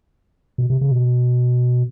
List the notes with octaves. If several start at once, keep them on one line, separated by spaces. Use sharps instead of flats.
B2
C3
C#3
B2